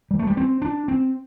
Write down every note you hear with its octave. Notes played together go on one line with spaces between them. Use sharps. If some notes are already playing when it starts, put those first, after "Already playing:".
G3
A3
G3
C4
D4
C4